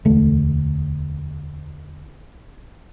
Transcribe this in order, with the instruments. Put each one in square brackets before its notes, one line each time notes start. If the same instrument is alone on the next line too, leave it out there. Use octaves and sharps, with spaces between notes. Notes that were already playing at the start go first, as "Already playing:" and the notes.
[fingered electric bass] E1 D2 A3